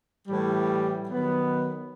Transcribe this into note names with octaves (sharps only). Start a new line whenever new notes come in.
A2 E3 G3
D#3 F#3 B3